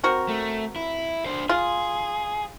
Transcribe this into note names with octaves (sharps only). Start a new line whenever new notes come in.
C4 F#4 A#4
A3
E4
D4 C5
F4 G#4